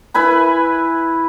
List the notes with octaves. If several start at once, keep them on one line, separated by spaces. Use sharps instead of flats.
E4 B4 G#5 B5